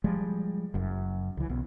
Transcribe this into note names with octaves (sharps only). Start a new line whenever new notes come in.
F3 G3 G#3
F#1 F#2
C#2 E3
B1 B3